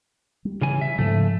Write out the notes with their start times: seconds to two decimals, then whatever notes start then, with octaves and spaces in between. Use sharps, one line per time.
0.45 G3
0.61 C#3 E3 G#5
0.81 E5
0.98 G#2 C#3 F3 A3